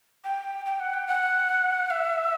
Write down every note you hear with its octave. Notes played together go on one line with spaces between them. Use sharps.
G5
G5
F#5
G5
F#5
E5